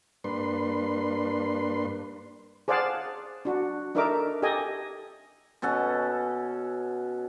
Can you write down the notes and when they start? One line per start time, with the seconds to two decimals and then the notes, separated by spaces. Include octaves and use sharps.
0.24 G2 A#3 D4 B4 C6
2.68 G#4 C5 D5 F5 F#5 A5
3.45 D4 F#4
3.95 D4 D#4 A4 A#4 E5 D6
4.42 G4 A4 D#5 G#5
5.62 B2 C#4 A4 F#5